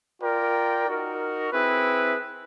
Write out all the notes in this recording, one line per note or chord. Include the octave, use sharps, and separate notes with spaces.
F4 A#4 D5 G5
D#4 F#4 A#4
C4 E4 G#4 B4